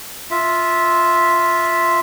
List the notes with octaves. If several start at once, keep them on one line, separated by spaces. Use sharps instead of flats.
F4 E5